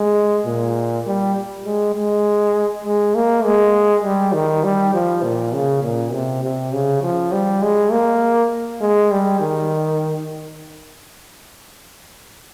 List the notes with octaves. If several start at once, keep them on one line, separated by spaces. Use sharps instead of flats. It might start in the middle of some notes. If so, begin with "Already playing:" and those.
Already playing: G#3
A#2
G3
G#3
G#3
G#3
A#3
G#3
G3
D#3
G3
F3
A#2
C#3
A#2
C3
C3
C#3
F3
G3
G#3
A#3
G#3
G3
D#3